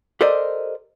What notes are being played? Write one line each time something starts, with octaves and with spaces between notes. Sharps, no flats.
G4 A4 A#4 C5 D5 D#5